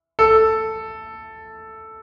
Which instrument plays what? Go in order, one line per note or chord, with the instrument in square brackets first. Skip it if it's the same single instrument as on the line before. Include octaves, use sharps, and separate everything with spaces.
[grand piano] A4